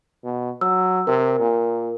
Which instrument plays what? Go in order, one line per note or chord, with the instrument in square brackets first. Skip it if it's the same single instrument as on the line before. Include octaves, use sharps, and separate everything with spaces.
[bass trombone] B2
[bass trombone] F#3 [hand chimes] E6
[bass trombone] C3 [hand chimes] A#4
[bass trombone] A#2